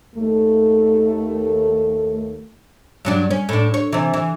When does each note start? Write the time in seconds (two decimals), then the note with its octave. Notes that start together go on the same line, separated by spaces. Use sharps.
0.16 D#2 A3
3.05 G2 F#3 D4
3.31 C#4
3.49 A2 D4
3.74 C#5
3.93 C3 E3
4.14 E3